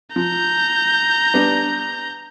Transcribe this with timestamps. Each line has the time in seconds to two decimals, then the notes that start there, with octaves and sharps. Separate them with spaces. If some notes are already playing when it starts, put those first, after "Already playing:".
0.16 F3 A#5 G6
1.34 G3 B3 D4